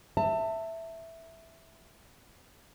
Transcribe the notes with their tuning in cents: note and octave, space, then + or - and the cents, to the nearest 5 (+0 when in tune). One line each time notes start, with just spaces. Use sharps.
E5 +0 A5 +25